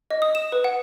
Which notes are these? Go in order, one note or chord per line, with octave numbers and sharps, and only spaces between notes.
D#5
D#6
E7
B4
F#5